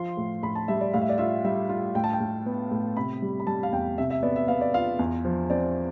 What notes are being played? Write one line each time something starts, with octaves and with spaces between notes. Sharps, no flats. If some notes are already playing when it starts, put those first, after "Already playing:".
Already playing: F3 F4 C6
A2
A2 B5
A5
G3 E5
D5
A2 F5
E5
D5
F4 E5
G3 E5
F4
A2 G5
A5
G5
A2
B3
A2
C3 B5
G3
B5
G3 A5
F5
E2 G5
C3 E5
E5
B3 D5
E5
B3 F5
D5
F4 F5
E2
F3
C4 D5